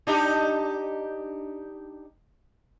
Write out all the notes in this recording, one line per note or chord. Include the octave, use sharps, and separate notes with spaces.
D4 D#4 G4